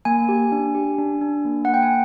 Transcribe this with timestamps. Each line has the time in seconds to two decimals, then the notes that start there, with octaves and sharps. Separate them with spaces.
0.05 A#3 G#5
0.29 G4
0.52 D4
0.74 G4
0.98 D4
1.21 D4
1.45 A#3
1.65 A#3 F#5
1.74 G5
1.83 G#5